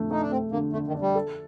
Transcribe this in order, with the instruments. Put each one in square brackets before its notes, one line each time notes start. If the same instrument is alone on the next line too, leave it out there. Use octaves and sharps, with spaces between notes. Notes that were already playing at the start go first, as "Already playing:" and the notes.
Already playing: [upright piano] F2 D3 A3
[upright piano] A3 [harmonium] D#4
[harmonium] D4
[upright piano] A3 [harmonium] C4
[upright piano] D3 [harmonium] A#3
[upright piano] D3 [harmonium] A3
[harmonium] D#3
[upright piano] D4
[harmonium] G3
[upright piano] A4